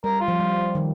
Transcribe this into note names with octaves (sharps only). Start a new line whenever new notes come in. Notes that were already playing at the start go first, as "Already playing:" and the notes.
G3 A#4
F4
F3
G3
D#3